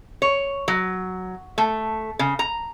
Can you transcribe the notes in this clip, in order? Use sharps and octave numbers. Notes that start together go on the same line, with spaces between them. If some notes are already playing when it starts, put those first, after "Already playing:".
C#5
F#3
A3
C#3
A#5